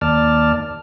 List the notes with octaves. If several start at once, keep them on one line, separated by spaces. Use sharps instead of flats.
D#2 D5 A5 F6